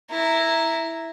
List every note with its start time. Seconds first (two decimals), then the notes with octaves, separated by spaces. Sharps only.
0.11 E4 A#5